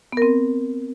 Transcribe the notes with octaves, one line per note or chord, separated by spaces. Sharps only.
B3 C4 A#4